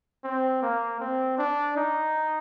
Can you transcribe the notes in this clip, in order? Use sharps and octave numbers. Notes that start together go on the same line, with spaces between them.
C4
A#3
C4
D4
D#4